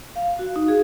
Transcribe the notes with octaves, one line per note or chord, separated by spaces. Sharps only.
F5
F#4
D#4
G#4